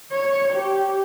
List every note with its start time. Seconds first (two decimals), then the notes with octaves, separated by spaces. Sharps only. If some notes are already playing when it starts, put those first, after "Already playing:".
0.12 C#5
0.53 G4